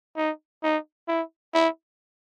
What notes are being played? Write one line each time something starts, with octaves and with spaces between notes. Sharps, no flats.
D#4
D#4
E4
E4